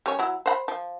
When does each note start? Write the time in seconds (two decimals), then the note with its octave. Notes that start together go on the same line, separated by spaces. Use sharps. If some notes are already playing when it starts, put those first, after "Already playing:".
0.06 G3 C#4 C#5
0.19 F#3 E4
0.46 C5 F#5 B5
0.68 F3